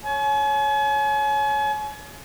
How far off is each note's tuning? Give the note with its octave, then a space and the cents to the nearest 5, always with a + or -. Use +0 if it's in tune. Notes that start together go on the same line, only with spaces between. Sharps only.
C#5 +0 G#5 +40